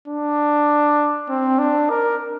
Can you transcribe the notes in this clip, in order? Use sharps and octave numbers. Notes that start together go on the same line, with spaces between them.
D4
C4
D4
A#4